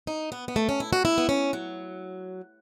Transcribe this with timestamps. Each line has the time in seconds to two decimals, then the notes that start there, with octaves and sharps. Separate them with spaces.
0.07 D#4
0.32 B3
0.48 B3
0.56 A3
0.69 C#4
0.80 E4
0.93 F#4
1.05 E4
1.18 B3
1.29 C#4
1.53 F#3